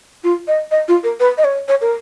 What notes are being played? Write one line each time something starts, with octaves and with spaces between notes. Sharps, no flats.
F4
D#5
D#5
F4
A#4
B4
D#5
C#5
C#5
A#4